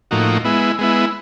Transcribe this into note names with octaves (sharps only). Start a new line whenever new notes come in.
A2 F3 A#3 D#4 F#4
G#3 B3 E4
G#3 B3 E4